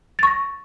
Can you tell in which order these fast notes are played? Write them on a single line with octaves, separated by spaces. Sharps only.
A6 C#6 A#6